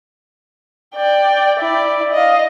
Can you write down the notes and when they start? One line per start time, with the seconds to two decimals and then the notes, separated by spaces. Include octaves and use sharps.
0.95 D5 G5
1.59 E4 D5
2.13 D#5 F5